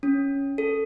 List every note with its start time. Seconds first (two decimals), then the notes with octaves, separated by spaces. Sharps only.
0.03 C#4
0.58 A4